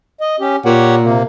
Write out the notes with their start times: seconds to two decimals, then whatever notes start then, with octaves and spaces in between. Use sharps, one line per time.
0.21 D#5
0.40 C#4 G4
0.65 A#2 G4 C#5 F#5
1.02 C3 A#3